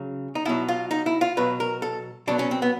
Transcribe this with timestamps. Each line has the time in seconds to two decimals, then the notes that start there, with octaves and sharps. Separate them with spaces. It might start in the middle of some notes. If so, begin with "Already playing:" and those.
Already playing: C#3 F#3
0.35 D#4
0.45 B2 F#3 E4
0.69 F4
0.91 D#4
1.06 E4
1.21 F4
1.37 B2 F#3 B4
1.60 A#4
1.82 A4
2.27 B2 F#3 D4
2.39 C#4
2.51 C4
2.62 B3